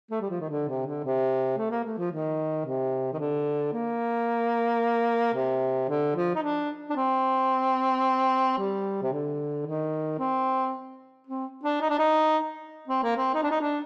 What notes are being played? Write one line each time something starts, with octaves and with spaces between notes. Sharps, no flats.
A3
G3
F3
D#3
D3
C3
D3
C3
A3
A#3
A3
F3
D#3
C3
D#3
D3
A#3
C3
D3
F3
D#4
D4
D4
C4
G3
C3
D3
D#3
C4
C4
D4
D#4
D4
D#4
C4
A#3
C4
D#4
D4
D#4
D4